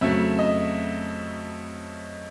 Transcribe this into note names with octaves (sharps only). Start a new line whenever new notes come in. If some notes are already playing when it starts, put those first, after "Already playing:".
F2 C#3 F#3 A3 E5
D#5